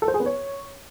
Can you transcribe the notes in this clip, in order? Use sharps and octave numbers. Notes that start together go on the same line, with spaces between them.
A4
C5
G#4
B3
C#5